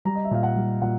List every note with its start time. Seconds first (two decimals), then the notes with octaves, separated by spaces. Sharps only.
0.05 G3 A#5
0.15 D#5
0.25 E5
0.31 A#2 F5
0.43 F#5
0.56 G3
0.82 A#2 F#5